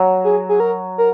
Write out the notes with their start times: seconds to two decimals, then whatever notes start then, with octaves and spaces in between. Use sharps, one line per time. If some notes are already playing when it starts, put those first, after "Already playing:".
Already playing: F#3
0.24 G#4
0.49 G#4
0.60 A#4
0.98 A#4